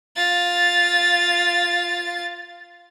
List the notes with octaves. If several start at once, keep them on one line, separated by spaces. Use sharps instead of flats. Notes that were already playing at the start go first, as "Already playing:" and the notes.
F4 A6